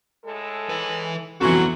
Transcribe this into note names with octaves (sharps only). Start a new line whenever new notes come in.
A2 G#3 A4
B4 E5
F2 E3 F#3 B3 F#4 A4